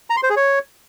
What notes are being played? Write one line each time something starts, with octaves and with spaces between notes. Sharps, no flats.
A#5
C6
C5
G#4
C#5